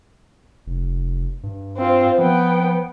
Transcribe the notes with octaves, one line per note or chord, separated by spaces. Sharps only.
F1
G2
C4 F4
F3 B3 G5